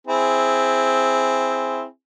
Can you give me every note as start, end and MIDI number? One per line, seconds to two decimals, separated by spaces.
0.07 1.84 60
0.07 1.84 64
0.07 1.84 68